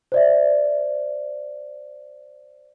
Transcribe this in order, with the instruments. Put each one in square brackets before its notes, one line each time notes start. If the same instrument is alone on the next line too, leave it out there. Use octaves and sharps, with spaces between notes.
[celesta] C5 D5 E5